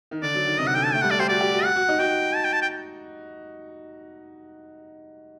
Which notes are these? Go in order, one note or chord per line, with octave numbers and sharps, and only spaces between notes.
D#3
D3 D5
F#3
D#3
C3 D#5
F#5
D3 G5
A5
A3 G5
G3 F#5
A3 D5
G4 C5
F#4 D5
G4
F#4
F#5
F#4
D#4
F#4 G5
A5
G5
A5
G5